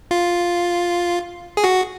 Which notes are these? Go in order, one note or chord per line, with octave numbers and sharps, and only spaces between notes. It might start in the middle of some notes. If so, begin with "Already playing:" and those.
F4
G#4
F#4